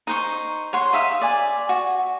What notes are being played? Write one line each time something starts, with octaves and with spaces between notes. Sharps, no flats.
D#4 C5 C#6
C#5 F#5 C6
D#4 E5 F5 D#6
D5 G#5
F#4